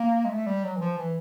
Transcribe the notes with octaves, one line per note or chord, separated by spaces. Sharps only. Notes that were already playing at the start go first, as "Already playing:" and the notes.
Already playing: A#3
G#3
A3
G3
F#3
E3
F3
E3